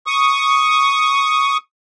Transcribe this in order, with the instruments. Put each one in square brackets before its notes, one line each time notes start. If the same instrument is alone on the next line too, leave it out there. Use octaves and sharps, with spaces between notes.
[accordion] C#6 D#6